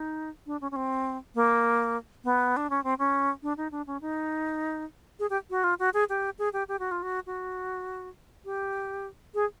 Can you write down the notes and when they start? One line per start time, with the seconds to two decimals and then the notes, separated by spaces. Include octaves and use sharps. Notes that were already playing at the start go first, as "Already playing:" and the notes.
Already playing: D#4
0.46 D4
0.61 C#4
0.71 C#4
0.76 C4
1.35 A#3
2.24 B3
2.57 D4
2.70 C#4
2.84 C4
2.99 C#4
3.43 D4
3.57 D#4
3.72 D4
3.87 C#4
4.01 D#4
5.19 G#4
5.30 G4
5.50 F#4
5.64 F4
5.79 F#4
5.94 G#4
6.09 G4
6.39 G#4
6.53 G4
6.68 G4
6.79 F#4
6.91 F4
7.03 F#4
7.26 F#4
8.45 G4
9.35 G#4